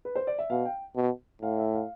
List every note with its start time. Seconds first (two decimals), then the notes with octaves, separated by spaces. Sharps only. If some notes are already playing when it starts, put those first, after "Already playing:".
0.05 B4
0.15 C5
0.27 D5
0.39 E5
0.50 B2 F5
0.65 G5
0.96 B2
1.42 A2 F5
1.58 E5
1.73 F5